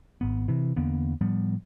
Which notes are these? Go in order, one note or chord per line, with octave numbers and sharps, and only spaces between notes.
G#1 B3
C3 E3
E2 D3 A#3 B3
A2 F3 G3 B3